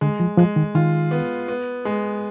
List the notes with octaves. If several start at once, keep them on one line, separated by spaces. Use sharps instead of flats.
D3 G#3
F3
F3 G#3
D#3
D#3 F4
B3
B3
G#3